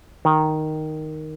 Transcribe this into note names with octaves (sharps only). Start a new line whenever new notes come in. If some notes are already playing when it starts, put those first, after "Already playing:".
D#3